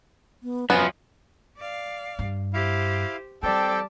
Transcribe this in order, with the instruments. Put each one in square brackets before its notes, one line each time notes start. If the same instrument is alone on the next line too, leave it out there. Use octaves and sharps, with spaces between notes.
[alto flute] B3
[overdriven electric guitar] F#2 F3 [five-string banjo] B3 [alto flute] G#5
[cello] D5 F5
[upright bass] G2
[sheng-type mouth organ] E4 F5 [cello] G4 C5
[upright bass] E3 [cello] G3 [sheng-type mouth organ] C4 A4 G5 [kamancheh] D5 A5